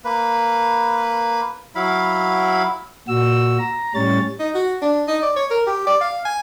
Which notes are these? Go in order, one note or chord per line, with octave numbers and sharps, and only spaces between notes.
A#3 B4
F#3 E4 F5 B5
A#2 F#4 E6
A#5
A2 G3 C#4 C#5 A6
D#4
F#4
D4
D#4
D5
C#5
A#4
G4
D5
F5
G#5